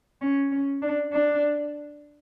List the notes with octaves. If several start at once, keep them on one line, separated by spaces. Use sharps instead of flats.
C#4
C#4
D4
D4